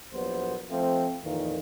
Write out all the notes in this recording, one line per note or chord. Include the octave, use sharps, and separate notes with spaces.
A#1 A#2 F#3 B3 C5
F3 A3 C4
F2 A#2 D#3 E3 A#3